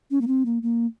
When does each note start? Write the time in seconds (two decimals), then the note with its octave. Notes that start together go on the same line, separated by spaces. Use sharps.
0.11 C#4
0.21 A#3
0.27 C4
0.46 A#3
0.63 A#3